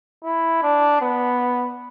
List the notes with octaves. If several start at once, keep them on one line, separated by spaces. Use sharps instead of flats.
E4
D4
B3